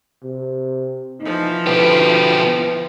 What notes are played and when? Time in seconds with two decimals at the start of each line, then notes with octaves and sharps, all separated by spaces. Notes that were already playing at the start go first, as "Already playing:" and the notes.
0.23 C3
1.21 E3 F3 D#4
1.67 B2 D3 G4 B4 B6